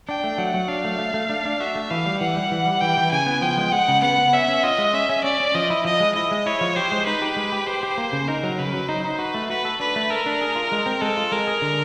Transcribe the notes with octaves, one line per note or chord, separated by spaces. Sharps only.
D4 G5
A3
F#3 F#5
F#3
D4 F5
A3
A3
A3
D4
D4
F#4 E5
A3
E3 F5
G3
E3 F#5
G3
E3
G3
E3 G5
E3
C#3 G#5
B3
F3 G5
G#3
G#3 F#5
C#3
B3 F#5
B3
C#4 E5
C#4
F4 D#5
G#3
C#4 E5
C#4
C#4 D5
C#4
F3 D#5
E4
F3 D#5
G#3
E4 D#5
G#3
E4 C#5
F3
G4 C5
G#3
D#4 B4
G4
G#3
G4
G4 C5
G4
A#3
C#3
D#4 A#4
F#3
C#3 B4
F#3
D#4 C5
D#4
F#4 B4
A3
F#4 B4
A4
D4 B4
A3
A4 A#4
D4
G#4
F4
G#3
C4
G#3 A4
F4
G#3 A#4
G#4
D3